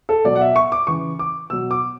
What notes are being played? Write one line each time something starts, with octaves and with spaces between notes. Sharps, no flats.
A4
B2 F#3 D5
F#5
E5
C#6
D6
C#3 E3 C#6
D6
B2 F#3 E6
D6